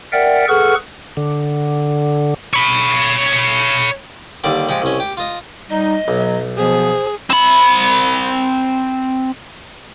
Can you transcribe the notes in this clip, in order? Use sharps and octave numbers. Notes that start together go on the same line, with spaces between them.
A#4 D5 E5 F#5 G5
G#4 A4 B4 F#5 C#6 F6
D3
C#5 B5
D#2 D3 G3 D5
F3 G#3 G4
C2 C#4
G4
F4 D#5
G3 D#4 D#5
B1 F#3
B2 F3 B3 G#4 C5
C4 B5